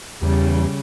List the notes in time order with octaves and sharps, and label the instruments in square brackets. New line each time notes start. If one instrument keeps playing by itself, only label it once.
[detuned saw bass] E2 [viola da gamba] C#3 [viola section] G3